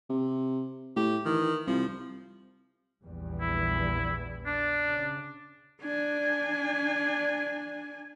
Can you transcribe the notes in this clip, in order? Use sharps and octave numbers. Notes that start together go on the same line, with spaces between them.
C3
A2 G4
D#3 E3
C2 F3
A#1 E2 G3
E4
D4
C#3
D4 G#5